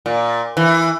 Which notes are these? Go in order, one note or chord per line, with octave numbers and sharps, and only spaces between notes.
A#2
E3